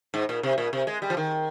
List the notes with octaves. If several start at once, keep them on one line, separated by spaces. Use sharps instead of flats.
G#2
A#2
C3
A#2
C3
G#3
G3
F3
D#3